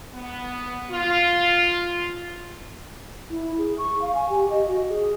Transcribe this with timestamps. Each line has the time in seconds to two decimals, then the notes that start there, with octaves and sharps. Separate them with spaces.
0.13 B3
0.91 F4
3.30 E4
3.58 G#4
3.78 C#6
4.02 F5
4.15 G#5
4.29 G4
4.50 D#5
4.68 F#4
4.89 G#4